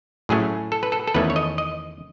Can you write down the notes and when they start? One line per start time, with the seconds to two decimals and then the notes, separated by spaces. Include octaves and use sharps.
0.29 A2 F#3 A3 C#4 G#4
0.72 A4
0.83 B4
0.92 A4
1.07 A4
1.14 E2 D#3 A3 C#4 B4
1.30 C#5
1.36 D#5
1.58 D#5